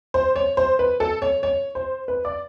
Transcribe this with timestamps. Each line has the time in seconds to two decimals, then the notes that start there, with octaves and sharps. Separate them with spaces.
0.14 C5
0.36 C#5
0.57 C5
0.79 B4
1.00 A4
1.22 C#5
1.43 C#5
1.75 C5
2.08 B4
2.25 D5